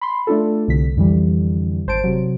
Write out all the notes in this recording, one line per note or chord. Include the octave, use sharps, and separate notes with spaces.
B5 C6
A3 D4 F4 A4
C2 D3 B6
F2 D3 E3 G3
G#1 C5 A5 D7
C3 F#3